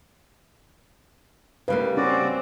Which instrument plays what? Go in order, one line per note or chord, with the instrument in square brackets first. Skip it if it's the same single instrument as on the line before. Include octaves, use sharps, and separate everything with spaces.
[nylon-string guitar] C#3 G3 A#3 [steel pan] B4 F5
[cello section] C4 [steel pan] C#4 [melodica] F#4 D5